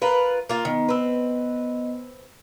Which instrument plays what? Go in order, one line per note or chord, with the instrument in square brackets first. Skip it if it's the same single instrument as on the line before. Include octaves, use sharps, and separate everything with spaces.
[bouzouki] F4 A#4 B4
A#3 F4
[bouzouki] D#3 [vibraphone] B3 D#5
[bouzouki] C4 B4